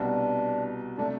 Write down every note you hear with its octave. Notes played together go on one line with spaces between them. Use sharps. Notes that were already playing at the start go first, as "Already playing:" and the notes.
Already playing: C2 B2 G3 B3 D4 F#4
C3 F#3 A3 D4